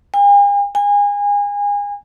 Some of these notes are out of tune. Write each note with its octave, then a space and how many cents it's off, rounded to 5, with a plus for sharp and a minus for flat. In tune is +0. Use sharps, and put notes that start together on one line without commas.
G#5 -45
G#5 -30